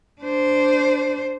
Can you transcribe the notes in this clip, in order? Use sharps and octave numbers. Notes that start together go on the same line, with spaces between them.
D4 C5